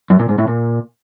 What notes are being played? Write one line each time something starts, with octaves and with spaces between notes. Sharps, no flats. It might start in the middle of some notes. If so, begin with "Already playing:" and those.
F#2
A#2
G#2
A2
A#2